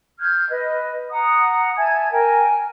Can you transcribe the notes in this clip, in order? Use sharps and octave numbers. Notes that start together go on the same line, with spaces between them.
F6 G6 G#6
B4 D#5
F#5 A#5 D#6
E5 G#5 A5 G#6
A#4 G5 G#5